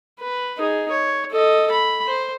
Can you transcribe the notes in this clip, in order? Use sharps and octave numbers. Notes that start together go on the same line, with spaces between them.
B4
D#4 G#4
C#5
A4 D#5
B5
C5